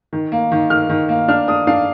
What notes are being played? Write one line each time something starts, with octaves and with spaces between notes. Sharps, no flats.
D#3
A#3
D#3
D#3 F6
D#3
A#3
D4 F6
D4 D#6
D4 F5